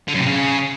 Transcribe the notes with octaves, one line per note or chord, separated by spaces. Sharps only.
D3
F#2
C3
C#3